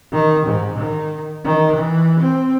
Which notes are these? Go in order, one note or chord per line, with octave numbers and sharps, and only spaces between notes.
D#3
G#2
D#3
D#3
E3
C4